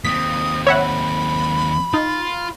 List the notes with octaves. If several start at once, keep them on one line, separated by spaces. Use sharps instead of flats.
D#2 C4 D#6 B6
C#5 E5 F#5 B5
D#4 F4